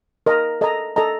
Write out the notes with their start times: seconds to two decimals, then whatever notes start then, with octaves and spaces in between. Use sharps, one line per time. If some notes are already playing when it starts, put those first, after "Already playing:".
0.26 A#4 D#5 A#5
0.61 A4 D#5 A#5
0.96 A4 D#5 A#5